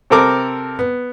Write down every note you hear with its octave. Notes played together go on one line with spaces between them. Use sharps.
C3 C4 A4 A#4 D6
B3